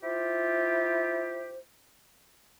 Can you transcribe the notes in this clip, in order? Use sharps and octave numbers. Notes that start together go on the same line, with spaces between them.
E4 F4 G4 C5